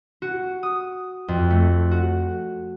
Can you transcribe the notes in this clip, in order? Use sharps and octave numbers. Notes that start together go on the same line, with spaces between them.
F#4
D#6
F2
A3
F#4